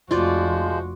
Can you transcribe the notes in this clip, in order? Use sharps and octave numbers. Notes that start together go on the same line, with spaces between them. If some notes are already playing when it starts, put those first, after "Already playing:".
F1 F3 G#3 F4 F#4 C5 D5